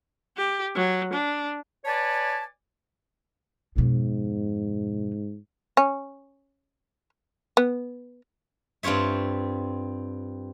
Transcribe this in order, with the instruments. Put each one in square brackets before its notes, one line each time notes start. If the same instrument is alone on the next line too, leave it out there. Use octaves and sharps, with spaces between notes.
[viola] G4
F#3
D4
[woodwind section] B4 C#5 D5 G#5 A5
[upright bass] F2 B2 [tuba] G#2
[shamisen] C#4
B3
[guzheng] G2 C4 F4 C#5 E5